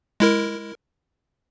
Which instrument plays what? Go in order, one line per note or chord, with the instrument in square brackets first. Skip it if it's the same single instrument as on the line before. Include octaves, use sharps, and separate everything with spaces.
[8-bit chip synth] G#3 E4 A#4